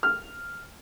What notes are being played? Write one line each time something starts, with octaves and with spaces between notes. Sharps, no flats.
F6